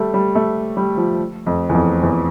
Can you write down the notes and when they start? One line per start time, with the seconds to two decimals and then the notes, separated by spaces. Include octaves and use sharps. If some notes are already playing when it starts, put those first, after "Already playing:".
Already playing: G3 A3
0.14 G3
0.35 A3
0.77 G3
0.97 F3
1.46 F2
1.69 E2
1.74 F2
2.03 E2